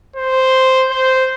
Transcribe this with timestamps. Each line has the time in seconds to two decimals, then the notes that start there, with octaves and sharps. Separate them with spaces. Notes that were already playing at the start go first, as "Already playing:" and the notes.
0.16 C5
0.91 C5